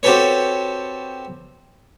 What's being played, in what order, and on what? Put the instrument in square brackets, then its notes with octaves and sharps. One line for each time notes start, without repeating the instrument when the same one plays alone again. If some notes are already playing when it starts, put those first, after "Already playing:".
[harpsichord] C4 F#4 G4 A4 B4 C#5